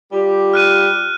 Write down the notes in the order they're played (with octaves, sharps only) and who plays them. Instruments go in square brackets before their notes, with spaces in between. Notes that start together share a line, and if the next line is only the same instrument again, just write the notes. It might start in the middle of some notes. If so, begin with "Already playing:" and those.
[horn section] G3 F4 G4
[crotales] F6 F#6 D#7